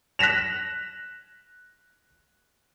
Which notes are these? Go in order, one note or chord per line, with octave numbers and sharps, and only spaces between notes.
F#6 A#6 B6 E7 F7